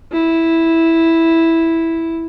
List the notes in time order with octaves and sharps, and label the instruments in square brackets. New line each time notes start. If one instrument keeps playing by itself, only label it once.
[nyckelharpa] E4